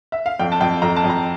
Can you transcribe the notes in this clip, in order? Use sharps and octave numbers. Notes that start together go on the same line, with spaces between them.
E5
F5
F2 G5
A5
F2 G5
F2 A#5
A5
F2
A#5